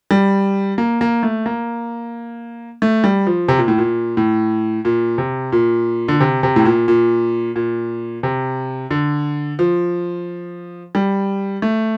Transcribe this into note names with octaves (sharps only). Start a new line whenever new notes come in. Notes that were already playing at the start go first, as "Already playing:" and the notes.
G3
A#3
A#3
A3
A#3
A3
G3
F3
C3
A#2
A2
A#2
A2
A#2
C3
A#2
D3
C3
C3
A2
A#2
A#2
A#2
C3
D3
F3
G3
A3